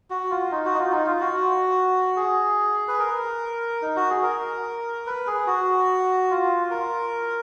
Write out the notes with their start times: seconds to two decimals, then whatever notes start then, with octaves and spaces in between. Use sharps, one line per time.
0.10 F#4
0.30 F4
0.52 D#4
0.65 F#4
0.74 D#4
0.79 F4
0.92 D#4
1.07 F4
1.20 F#4
2.16 G#4
2.88 B4
2.99 A#4
3.82 D#4
3.96 F#4
4.10 G#4
4.23 A#4
5.07 B4
5.27 G#4
5.47 F#4
6.31 F4
6.71 A#4